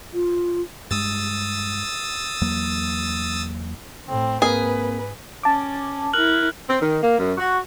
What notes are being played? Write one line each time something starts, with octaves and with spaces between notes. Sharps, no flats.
F4
G2 G#3 D#6 E6 A6
E2 F#3 A#3
A2 C4
G#2 A#3 C4 G#4 A#4 B4
C#4 A5 D6
E4 A#4 F6 F#6 F#7
C4
D#3
A#3
F#2
F#4